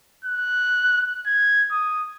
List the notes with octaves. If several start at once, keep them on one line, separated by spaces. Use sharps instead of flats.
F#6
G#6
D#6